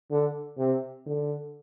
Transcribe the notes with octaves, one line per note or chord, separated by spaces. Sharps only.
D3
C3
D3